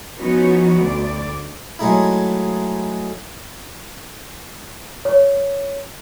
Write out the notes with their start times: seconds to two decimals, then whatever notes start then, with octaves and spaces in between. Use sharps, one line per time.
0.17 F3 B3 C#4 D#4 F#4 C#5
0.75 D2 D5
1.79 F#3 G#3 A3 D#4 E4
5.05 C#5